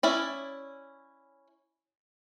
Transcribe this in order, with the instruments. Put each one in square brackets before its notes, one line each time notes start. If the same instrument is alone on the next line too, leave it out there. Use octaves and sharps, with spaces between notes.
[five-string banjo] C#4 E4 D5